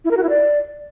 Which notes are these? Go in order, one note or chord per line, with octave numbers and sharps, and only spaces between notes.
E4
A#4
F#4
E4
D5